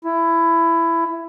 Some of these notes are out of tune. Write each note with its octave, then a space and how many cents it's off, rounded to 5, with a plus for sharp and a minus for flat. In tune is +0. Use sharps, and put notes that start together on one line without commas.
E4 +15